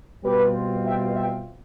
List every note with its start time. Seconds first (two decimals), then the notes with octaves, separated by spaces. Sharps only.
0.24 B2 G3 C4 F4 G4 B4
0.86 E5 G5
1.16 E5 G5